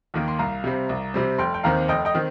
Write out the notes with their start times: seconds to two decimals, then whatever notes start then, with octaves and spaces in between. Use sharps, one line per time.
0.14 D#2 D#3 A#3
0.28 C6
0.39 C2 F5 A#5
0.64 C3 G3 C4
0.89 C2
1.14 C3 G3 C4
1.38 F1 G5 C6
1.54 G5
1.64 D#2 D#3 C4 F5 A#5
1.88 F1 D#5 G5
2.05 D#5 G5
2.14 D#3 C4